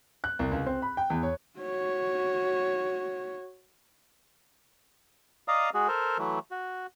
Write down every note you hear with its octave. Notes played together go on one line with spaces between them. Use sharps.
F#6
C2
C#2
C4
B5
G5
E2
C#5
F#4 C#5
D5 D#5 F5 A#5 D#6
G#3 F#4 G#4
A4 A#4 C5
E3 F#3 A3
F#4